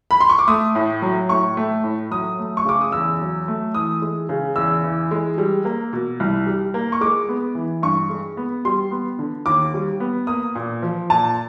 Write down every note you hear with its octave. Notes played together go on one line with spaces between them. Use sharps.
B5
C6
C#6
D6
A3 D#6
A2
F#3
A2 C#6
A3
A2
F#3 D#6
A3
C#6
C#3 D6
D#6
E2 E6
F#3
A3
E3 D#6
G#3
C#3
E2 E6
E3
G#3
G3
A#3
B2
C2
G3
A#3
C#6
G#3 D6
B3
E3
G2 C#6
G#3
B3
G3 C6
B3
D3
D#2 D6
G3
B3
A#3 D#6
A#2
F3
A#2 A5